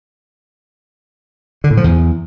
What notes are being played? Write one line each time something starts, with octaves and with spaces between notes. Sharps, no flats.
D3
A2
F3
E2